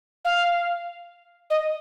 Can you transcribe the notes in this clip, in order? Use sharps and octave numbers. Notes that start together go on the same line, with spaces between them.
F5
D#5